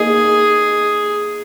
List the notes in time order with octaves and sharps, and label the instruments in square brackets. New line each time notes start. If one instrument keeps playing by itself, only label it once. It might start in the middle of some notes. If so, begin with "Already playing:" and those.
Already playing: [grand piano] A#3 D#4 [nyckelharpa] G#4